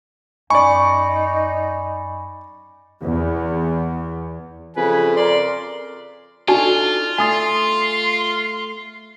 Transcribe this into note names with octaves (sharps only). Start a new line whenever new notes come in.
F#2 D#4 D5 G#5 B5 C#6
E2
F2 C#3 B4 G#5
A#4 D5 C6
D4 D#4 F4 F#4 A4 G#5 A5
A3 G#5 C6 D#6 A6